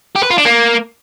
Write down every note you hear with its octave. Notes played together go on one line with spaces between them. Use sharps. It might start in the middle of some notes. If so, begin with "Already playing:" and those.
G4
B4
F4
D4
A#3